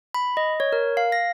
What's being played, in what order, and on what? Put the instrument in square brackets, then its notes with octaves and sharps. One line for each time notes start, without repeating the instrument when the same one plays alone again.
[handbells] B5
D#5
C#5
A#4
F5
A#6